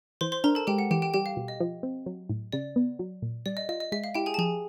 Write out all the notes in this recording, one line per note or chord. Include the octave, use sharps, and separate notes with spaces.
E3 C5 C6
C5 C6
D4 A#4 A#5
A4 A5
G#3 G4 G5
F#5
E3 G4 G5
G4 G5
G3 G4 G5
F5
B2
D#5
F3
C4
F#3
A2
C#3 D5
B3
F#3
A#2
G3 D5
D#5
F4 D#5
D#5
G#3 E5
F5
E4 G4 G5
G#4 G#5
A5
F3 G#4 G#5